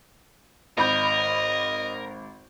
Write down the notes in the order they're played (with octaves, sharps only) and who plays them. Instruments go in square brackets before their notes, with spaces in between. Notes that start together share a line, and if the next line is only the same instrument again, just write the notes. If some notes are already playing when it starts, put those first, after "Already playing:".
[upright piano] G#1 B5 G6 [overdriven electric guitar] A#4 [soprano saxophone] D#5